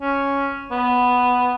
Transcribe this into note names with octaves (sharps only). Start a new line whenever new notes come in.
C#4
B3